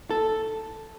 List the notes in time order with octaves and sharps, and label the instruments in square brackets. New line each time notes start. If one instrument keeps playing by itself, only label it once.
[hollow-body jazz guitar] A4